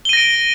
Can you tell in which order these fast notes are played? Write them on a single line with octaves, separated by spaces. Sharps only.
G7 D#7 A#6 D7